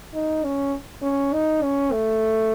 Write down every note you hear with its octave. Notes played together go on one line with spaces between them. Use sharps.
D#4
C#4
C#4
D#4
C#4
A3